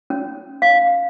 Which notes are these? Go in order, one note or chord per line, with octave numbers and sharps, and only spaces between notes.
C#4
F5